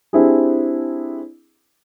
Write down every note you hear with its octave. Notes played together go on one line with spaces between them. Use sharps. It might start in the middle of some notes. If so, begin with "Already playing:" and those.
C4 D4 E4 G4 G#4